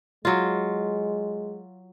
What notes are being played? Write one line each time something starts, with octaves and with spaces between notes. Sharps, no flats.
F#3 G#3 F4